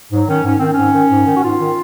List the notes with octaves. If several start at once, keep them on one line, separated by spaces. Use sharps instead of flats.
G#2 F#3
D#3 C#4
G#2 C#4
D#3 C4
C#4
G#2
D#3
G#2
D#3
F#4
G#2 F4
D#3